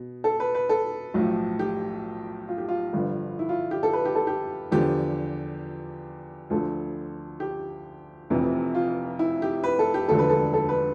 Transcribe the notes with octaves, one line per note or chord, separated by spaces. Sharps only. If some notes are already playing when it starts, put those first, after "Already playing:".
Already playing: B2
A4
B4
B4
A4
B1 A2 F3
G4
F4
G4
F4
G1 G2 D3 F3
E4
F4
G4
A4
B4
G4
A4
G4
E2 D3 F3 G4
D2 D3 F3 A4
G4
F1 F2 C3 E3
F4
E4
G4
B4
A4
G4
E1 D2 D3 F3 A4
B4
A4
A4
B4